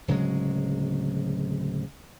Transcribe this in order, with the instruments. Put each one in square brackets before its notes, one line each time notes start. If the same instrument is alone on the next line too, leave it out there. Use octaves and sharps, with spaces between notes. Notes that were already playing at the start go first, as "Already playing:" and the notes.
[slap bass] D1 C#3 F#3 G#3